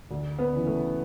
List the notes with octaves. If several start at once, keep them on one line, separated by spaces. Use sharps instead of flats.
D2
B3
C#3 E3
A3